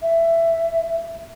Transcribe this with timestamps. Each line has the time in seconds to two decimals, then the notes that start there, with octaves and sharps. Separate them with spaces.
0.02 E5